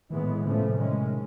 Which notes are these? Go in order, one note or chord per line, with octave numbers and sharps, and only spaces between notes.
A2 D#3 E3 G#3 B3
A2 D3 F3 A3 C#4
C3
D#3 G#3 C#4